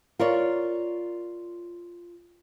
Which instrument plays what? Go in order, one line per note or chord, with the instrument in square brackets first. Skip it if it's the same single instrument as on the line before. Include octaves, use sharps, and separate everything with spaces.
[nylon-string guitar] F4 A#4 C#5 D5